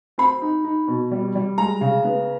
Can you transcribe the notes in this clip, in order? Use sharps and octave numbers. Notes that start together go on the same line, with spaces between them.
C4 B5
D#4
D#4
B2
G3
G3
G#3 A#5
C#3
B3